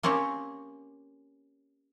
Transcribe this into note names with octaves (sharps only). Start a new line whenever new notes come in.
A#3 C4 C#4 G4 C#5